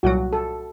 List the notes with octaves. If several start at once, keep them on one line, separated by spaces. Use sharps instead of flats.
C2 A#2 F#3 F#4
A4